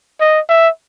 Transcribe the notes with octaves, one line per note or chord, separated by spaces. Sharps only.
D#5
E5